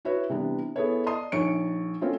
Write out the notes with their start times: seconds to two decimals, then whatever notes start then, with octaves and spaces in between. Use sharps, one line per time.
0.05 E4 F#4 B4 C#5 E5
0.29 C3 E3 G3 B3 D4
0.76 B3 E4 G#4 A4 B4 C#5
1.06 D5 D#5 A5 C6 D#6
1.32 A#1 D#4 C#5 C#6 C#7 D7
2.01 A3 C4 C#4 F4